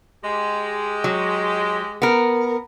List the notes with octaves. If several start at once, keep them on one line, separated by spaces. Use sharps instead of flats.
G#3 G4
F#3
B3 A#4